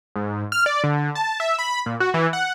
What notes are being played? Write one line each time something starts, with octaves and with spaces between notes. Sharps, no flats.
G#2
F6
D5
D3
A5
E5
B5
A#2
F#4
E3
F#5